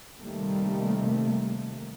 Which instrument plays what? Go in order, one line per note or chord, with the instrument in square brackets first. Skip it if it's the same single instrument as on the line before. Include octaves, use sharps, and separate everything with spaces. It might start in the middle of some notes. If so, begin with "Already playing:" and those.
[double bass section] C3 D#3 G3 A3 A#3